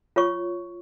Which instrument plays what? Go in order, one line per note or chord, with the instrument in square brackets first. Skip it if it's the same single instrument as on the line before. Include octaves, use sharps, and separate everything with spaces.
[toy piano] F4 C#5 C#6